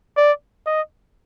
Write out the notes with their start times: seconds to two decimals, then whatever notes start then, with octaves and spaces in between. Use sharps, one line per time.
0.17 D5
0.66 D#5